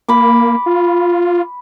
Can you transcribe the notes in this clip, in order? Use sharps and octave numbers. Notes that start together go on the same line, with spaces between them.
A#3 B5 D6
F4